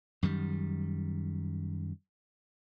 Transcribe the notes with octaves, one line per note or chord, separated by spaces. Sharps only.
F#2 D#3 G3